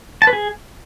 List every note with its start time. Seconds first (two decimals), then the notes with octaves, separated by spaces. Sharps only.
0.22 A5
0.27 B4
0.33 G#4